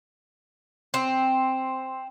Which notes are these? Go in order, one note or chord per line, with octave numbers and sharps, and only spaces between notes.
C4